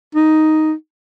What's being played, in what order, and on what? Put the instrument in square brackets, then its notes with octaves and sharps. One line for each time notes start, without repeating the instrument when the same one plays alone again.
[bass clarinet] D#4